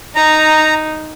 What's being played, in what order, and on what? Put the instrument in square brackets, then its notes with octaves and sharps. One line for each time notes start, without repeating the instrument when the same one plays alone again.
[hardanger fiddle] D#4 [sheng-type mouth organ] A#5